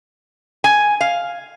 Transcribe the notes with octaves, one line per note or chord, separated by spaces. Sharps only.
G#5
F5